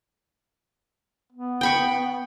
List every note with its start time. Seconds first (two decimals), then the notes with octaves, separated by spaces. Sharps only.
1.33 B3
1.61 G5 B5 C#6